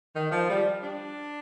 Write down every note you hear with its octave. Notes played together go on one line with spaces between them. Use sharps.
D#3
F3
G3
D4